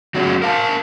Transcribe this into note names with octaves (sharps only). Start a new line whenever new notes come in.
F#3 B3 C#4 G#4
A#4 F5 A5